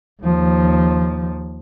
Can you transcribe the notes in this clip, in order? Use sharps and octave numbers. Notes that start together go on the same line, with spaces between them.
D#2 F3